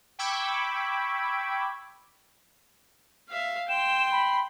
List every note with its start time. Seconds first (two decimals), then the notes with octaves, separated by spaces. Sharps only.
0.19 G5 B5 C#6 D6 E6 G#6
3.29 E5 F5
3.68 G5 C6 E7
4.11 B5